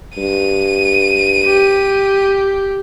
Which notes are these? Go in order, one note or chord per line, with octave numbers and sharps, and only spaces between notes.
G2 D#7
G4